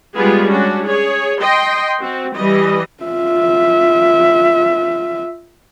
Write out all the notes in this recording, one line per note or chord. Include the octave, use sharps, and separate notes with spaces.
G3 G#3 B3 F4 G#4
C#4 D4 F#4
G#4 C#5
D#5 G5 C6
C4 F#4
E3 G3 D#5
F4 E5